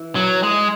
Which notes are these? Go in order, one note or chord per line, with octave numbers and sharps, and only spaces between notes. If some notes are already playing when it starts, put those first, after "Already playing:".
Already playing: E3
F#3
G#3